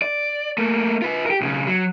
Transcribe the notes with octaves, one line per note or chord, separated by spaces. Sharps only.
D5
A3 A#3
F4 B4
G4 A#4
B1 C#3
F#3